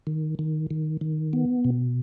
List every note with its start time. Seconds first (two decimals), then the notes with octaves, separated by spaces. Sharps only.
0.07 D#3
0.39 D#3
0.71 D#3
1.01 D#3
1.33 B3
1.65 B2